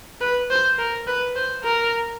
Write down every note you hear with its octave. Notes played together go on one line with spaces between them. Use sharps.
B4
C5
A#4
B4
C5
A#4